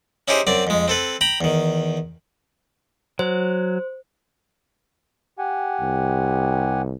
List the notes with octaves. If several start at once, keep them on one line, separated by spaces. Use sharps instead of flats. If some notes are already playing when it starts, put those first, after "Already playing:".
C#4 D#4 E4 G4 G#4 C5
F#2 C4 D5
F2 G#3
C4 A4 B4
G5 A#5 B5
E2 D#3
F#3 C5
G4 F#5 G#5
C2